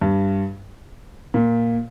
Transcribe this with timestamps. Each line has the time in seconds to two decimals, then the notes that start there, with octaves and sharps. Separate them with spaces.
0.01 G2
1.34 A#2